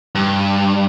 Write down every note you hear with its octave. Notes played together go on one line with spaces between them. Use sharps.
G2